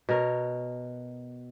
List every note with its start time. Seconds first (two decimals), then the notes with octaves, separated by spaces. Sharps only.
0.09 B2 A#4 C#5